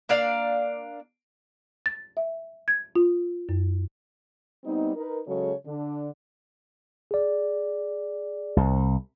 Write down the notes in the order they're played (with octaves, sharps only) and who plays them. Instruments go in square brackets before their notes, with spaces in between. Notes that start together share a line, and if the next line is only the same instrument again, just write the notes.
[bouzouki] A#3 D4 D5 F5
[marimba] A6
E5
G#6
F4
F#2
[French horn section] G3 B3 C4 D#4
D#4 A#4 B4
C#3 F#3 G#3 F#4 A4 C#5
D3 D4
[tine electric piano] G#4 D5
[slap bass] C2